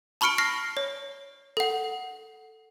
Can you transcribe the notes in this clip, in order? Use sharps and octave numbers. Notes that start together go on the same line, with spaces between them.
A5 B5 C#6 F6 C#7 D7
F6 A#6 C7
C#5
A4 F#5